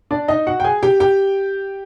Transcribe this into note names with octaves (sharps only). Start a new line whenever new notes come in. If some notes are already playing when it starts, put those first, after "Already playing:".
D4 D5
D#4 D#5
F#4 F#5
G5
G#4 G#5
G4 G5
G4 G5